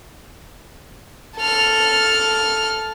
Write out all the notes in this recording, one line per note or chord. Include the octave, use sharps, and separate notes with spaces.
A4 F6